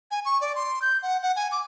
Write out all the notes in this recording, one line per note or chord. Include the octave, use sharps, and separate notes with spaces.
G#5
C#6
D5
C6
G6
F#5
F#5
G#5
D6